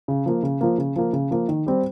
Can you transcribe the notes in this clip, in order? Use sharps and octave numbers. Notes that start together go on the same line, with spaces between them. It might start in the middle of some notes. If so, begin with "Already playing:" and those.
C#3
F3 A#3
C#3
F3 A#3
C#3
F3 A#3
C#3
F3 A#3
D#3
G3 C4